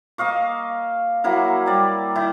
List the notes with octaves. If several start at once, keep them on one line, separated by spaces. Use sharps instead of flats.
A#3 D#5 F5 C#6
F#3 A#3 E4 A#4
G3 D5
D#3 E4